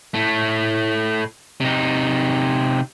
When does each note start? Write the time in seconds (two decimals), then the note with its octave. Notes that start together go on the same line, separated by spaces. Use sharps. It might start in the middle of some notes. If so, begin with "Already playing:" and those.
0.14 A2 A3
1.60 C3 D#4